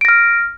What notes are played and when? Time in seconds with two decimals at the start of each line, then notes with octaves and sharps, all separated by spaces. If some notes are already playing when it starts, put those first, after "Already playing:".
0.01 D7
0.05 A#6
0.08 F6